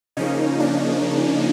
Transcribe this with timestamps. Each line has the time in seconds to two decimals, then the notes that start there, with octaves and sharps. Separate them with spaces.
0.17 C#3 F3 A#3 C#4 D#4
0.60 D4